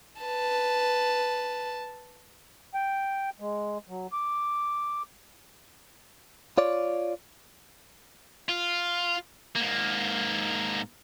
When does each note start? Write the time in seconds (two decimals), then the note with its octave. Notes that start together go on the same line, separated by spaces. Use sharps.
0.21 B4 A5
2.74 G5
3.40 G#3
3.89 F#3
4.12 D6
6.58 F4 C#5 D5
8.49 F4
9.56 G#2 A#3